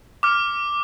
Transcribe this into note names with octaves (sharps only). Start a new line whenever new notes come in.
D6 F6